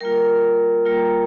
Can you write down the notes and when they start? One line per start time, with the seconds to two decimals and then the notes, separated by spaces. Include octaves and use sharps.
0.01 G3 A#3 F4 A#4
0.86 G3 A#3 F4